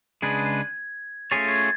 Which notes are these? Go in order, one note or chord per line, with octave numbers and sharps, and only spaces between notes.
C#3 G#3 D4 G#4 B4 G#6
A3 C#4 F4 G#4 C#5 A6
A6
G#6